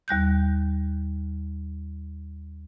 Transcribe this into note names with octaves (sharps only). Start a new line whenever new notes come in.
D#2 G3 F#6 G6